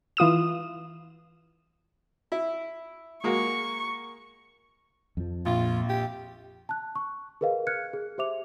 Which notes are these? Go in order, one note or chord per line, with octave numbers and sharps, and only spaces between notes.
E3 F4 D#6 E7
E4
G#3 A#3 F#4 C#6
F2 F3
A#1 F4
G4
A5 F#6
C#6
G#4 A#4 B4 D#5 F5
F6 F#6 G#6 C#7
G#4
G4 C5 E5 D6 F7